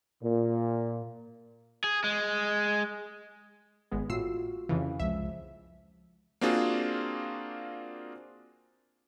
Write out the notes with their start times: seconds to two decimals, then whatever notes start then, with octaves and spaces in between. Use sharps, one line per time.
0.23 A#2
1.84 G#4
2.04 G#3
3.91 G#1 G#3 B3
4.10 A2 F4 F#4 E6 C7
4.69 F2 C#3 E3 F5
5.00 C2 F3 G#3 E5
6.41 A#3 C4 D4 F4 F#4 G#4